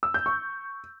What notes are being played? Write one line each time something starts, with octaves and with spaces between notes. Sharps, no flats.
E6
G6
C#6